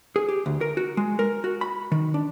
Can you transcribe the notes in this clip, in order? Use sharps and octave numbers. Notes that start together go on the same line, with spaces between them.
G#4
G4
D2
A#4
F#4
G#3
A#4
F#4
B5
D#3
D4